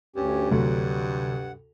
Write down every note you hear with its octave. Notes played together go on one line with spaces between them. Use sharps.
D2 G2 C#4 G4
D2 C3 F#3 F#5